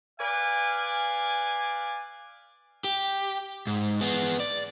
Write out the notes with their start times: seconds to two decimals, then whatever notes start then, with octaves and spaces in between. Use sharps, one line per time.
0.19 B4 D5 F5 G#5
2.84 G4
3.67 G#2
4.01 B3 G#4
4.40 D5